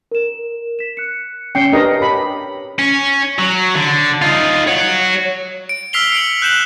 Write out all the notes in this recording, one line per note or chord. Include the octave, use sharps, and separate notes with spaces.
A#4 E7
B6 E7
F#6 C#7
C#4 G5 C7 C#7
D4 G4 A#4 B4 D#5
G4 C#5 B5
C#4
F#3
D3
D#4 F4
C#5 F#5
D7
E6 F6 B6 C7 F7 G7
C#7 D7 F#7
F#6 G6 E7 F#7